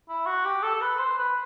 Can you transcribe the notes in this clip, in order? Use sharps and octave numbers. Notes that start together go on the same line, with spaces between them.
E4
F#4
G4
A4
A4
B4
C5
B4